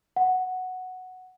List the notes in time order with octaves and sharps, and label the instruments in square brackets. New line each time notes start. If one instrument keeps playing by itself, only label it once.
[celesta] F#5